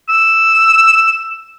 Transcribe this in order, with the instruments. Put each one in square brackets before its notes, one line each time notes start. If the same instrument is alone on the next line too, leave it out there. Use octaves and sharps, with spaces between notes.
[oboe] E6